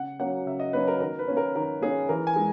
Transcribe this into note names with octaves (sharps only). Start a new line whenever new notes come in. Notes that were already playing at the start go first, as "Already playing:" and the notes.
Already playing: C#3 F#5
F#3 A#3 C#4 F#5
C#3 E5
D#5
F#3 A#3 C#4 B4
A#4
D#3 A#4
B4
A#3 C#4
A#4
D#3 A#4
A#3 C#4 G#4
E3 A#4
G#5
G#3